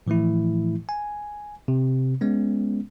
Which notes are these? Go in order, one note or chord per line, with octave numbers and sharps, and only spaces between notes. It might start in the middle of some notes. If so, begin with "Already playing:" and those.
A2 E3 F3 A3 E4
G#5
C3
G#3 B3 C#4